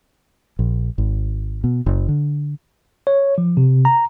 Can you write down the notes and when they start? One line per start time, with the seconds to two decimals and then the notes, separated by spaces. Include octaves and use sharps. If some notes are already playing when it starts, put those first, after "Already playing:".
0.59 A#1
0.98 G#1
1.64 B2
1.86 F#1
2.08 D3
3.07 C#5
3.38 F3
3.57 C3
3.85 A#5